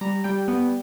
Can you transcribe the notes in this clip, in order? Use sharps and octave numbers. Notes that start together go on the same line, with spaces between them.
G3 A#5
G3 G5
B3